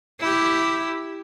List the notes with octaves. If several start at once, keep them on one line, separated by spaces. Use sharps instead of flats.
E4 G4